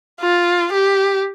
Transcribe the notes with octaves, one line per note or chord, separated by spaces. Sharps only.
F4
G4